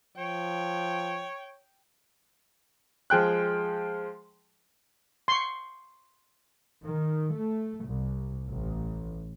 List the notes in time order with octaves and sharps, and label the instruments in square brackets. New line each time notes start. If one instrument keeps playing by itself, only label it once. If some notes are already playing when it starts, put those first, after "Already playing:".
[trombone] F3 [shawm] C#5 [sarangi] G5
[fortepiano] F3 G#3 G5 F#6
[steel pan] C6 C#6
[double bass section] D#3
A3
C2
A1